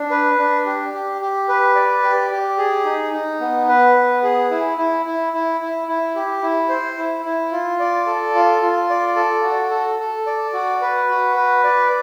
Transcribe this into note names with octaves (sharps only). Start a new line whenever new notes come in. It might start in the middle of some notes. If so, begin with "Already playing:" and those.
Already playing: D4
B4
D4
G4
G4
G4
B4
D5
G4
G4
G#4
D#4
D#4
B3
B4
B3
G#4
E4
E4
E4
E4
E4
E4
G4
E4
C5
E4
E4
F4
D5
A4
F4
F4
D5
A4
F#4
A4
A4
D5
F#4
B4
F#4
B4
D5